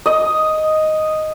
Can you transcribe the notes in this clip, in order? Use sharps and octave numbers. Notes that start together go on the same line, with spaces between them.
D#5